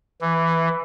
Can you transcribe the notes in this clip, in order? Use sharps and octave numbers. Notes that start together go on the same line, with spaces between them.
E3